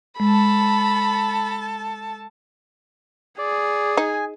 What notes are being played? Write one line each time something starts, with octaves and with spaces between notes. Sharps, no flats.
G#3 A4 A5 B5
G#4 D5
D#4 G#5